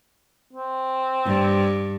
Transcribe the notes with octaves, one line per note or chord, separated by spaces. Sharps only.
C4
G2